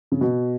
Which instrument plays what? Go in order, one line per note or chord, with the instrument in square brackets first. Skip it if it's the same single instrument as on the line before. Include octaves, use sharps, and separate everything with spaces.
[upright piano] C#3
B2